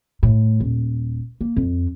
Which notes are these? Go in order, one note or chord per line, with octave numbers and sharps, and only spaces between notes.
A2
D#1
A#3
F2